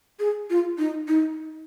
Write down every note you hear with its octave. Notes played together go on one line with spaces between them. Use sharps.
G#4
F4
D#4
D#4